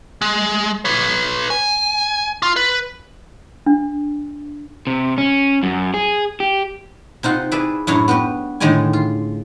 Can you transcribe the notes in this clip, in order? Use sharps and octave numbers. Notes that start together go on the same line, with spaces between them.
G#3
B4 C#5
G#5
F4
B4
D4
C3
C#4
F#2
G#4
G4
C3 D#4 F4 F#5
E4 G#4 B4 D5 E5
F#2 A2 D4 E4 C#5 A#5
B3 F#4 G4 B4
A2 D3 D#3 G#3 D5 G#5
F4